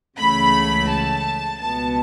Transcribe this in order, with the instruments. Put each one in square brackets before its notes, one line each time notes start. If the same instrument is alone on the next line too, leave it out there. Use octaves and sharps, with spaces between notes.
[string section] C#2 C#3 E3 A3 B5
A5
C#2 B2 B3 A5